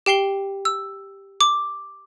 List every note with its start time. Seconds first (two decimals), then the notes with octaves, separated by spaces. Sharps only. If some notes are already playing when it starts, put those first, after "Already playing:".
0.06 G4 G5 C7 G7
0.65 E6
1.41 D6